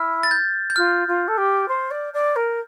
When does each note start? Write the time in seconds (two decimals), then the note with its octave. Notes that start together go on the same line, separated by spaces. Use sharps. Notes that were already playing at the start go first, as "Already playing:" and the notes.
Already playing: E4 F6
0.23 A6
0.31 G6
0.70 G6
0.76 F4 F6
1.07 F4
1.27 A4
1.37 G4
1.68 C5
1.90 D5
2.13 D5
2.35 A#4